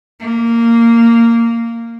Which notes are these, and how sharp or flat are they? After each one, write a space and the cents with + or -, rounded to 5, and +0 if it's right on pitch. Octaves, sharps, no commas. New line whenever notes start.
A#3 -10